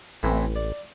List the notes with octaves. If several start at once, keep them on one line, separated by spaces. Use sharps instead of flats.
A1 A2 E3 C4
D5